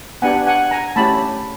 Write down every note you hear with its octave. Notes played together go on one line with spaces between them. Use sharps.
B3 D4 G4 F#5 G#5
F#5 G#5
G#5 A#5
A3 C#4 E4 G4 A5 B5